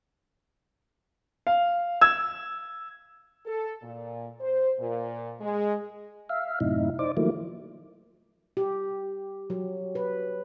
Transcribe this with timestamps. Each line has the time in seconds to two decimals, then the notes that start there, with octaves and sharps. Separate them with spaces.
1.47 F5
2.01 E6 G#6
3.46 A4
3.83 A#2
4.41 C5
4.79 A#2
5.41 G#3
6.29 E5 F5
6.60 F#2 A2 C3 D#4 E4
6.99 D#4 C5 D5 D6
7.17 D#3 F3 F#3 A3 A#3 E4
8.57 G4
9.50 F#3
9.95 B4